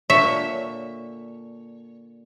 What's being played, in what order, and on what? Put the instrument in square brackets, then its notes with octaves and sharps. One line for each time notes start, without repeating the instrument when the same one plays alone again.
[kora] A#2 D3 [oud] C#5 [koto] E5 [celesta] C#6